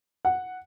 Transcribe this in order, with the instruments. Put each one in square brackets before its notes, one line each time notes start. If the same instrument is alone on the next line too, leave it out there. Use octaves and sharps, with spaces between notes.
[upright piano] F#5